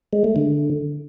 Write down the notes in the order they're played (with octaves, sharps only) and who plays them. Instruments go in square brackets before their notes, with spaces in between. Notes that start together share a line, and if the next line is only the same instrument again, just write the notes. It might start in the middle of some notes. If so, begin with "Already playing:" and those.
[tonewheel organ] G#3
A3
D3